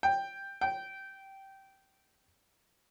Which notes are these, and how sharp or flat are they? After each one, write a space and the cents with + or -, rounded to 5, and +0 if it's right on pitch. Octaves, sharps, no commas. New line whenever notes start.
G5 +5
G5 -15